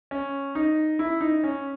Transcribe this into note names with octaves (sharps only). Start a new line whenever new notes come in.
C#4
D#4
E4
D#4
C#4